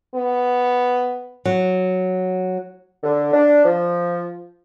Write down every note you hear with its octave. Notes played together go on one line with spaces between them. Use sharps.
B3
F#3
D3
D4
F3